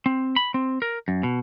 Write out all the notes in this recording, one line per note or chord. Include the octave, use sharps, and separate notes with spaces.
C4
B5
C4
A#4
F#2
B2